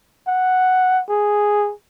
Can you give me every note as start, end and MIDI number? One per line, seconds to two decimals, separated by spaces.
0.28 1.02 78
1.09 1.72 68